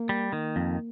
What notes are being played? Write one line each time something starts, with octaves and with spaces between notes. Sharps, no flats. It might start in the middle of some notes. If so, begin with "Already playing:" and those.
Already playing: A#3
G3
D#3 A#3
F2